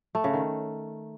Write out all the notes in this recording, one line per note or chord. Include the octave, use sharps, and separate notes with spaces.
A3
C#3
D#3